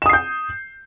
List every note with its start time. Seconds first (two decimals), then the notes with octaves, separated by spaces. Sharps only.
0.02 E7
0.06 D#6
0.09 C7
0.13 G6